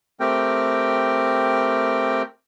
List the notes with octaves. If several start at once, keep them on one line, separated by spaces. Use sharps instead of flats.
A3 C4 G4 A#4 G5